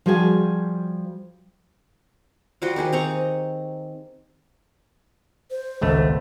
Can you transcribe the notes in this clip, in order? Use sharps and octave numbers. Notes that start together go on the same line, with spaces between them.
F3 G3 F#4 G#4 C5 G#5
F3 G3 F#4 C6
D#3 G4 G#4 D#5
C4 A#5 C#6
C5
G#1 C#2 A3